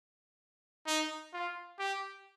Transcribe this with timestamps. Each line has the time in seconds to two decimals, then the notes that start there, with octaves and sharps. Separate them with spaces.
0.87 D#4
1.33 F4
1.79 G4